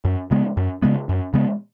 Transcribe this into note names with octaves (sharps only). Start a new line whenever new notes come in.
F#2
C#3 G#3 B3
F#2
C#3 G#3 B3
F#2
C#3 G#3 B3